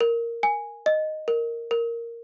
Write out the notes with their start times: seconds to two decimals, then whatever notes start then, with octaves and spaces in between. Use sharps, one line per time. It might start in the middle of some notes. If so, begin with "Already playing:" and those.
0.01 A#4
0.43 G#5
0.86 D#5
1.28 A#4
1.71 A#4